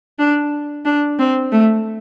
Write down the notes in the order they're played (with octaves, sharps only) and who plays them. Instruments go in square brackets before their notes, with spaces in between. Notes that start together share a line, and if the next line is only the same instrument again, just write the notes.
[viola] D4
D4
C4
A3